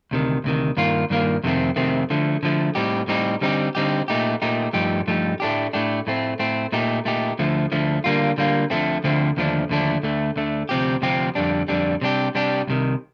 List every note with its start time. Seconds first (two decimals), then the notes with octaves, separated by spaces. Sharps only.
0.11 D2 C3 D#3
0.44 D2 C3 D#3
0.77 G2 D#3 A#3 F4
1.10 G2 D#3 A#3 F4
1.44 F2 C3 D#3 A3 C4
1.76 F2 C3 D#3 A3 C4
2.10 D3 F3 A3
2.43 D3 F3 A3
2.75 A2 G3 C4 D#4 G4
3.08 A2 G3 C4 D#4 G4
3.41 D3 G3 C4 D#4 G4
3.75 D3 G3 C4 D#4 G4
4.08 A#2 A3 D#4 G4
4.42 A#2 A3 D#4 G4
4.73 G2 F3 A3 D#4 G4
5.07 G2 F3 A3 D#4 G4
5.40 A2 A3 D4 G4
5.73 A2 A3 D4 G4
6.07 A2 A3 C4
6.39 A2 A3 C4
6.72 A#2 A3 D#4 G4
7.05 A#2 A3 D#4 G4
7.39 D2 D3 F3 A3
7.72 D2 D3 F3 A3
8.04 D3 G3 A#3 F4
8.38 D3 G3 A#3 F4
8.70 D2 D3 F3 A3 C4
9.04 D2 D3 F3 A3 C4
9.37 D#2 D3 F3 A3 D4
9.69 D#2 D3 F3 A3 D4
10.03 D2 D3 A3
10.36 D2 D3 A3
10.69 D2 C3 F3 C4 G4
11.02 D2 C3 F3 C4 G4
11.35 F2 D3 G3 D4
11.68 F2 D3 G3 D4
12.01 C3 G3 D4 G4
12.35 C3 G3 D4 G4
12.67 C2 C3 D#3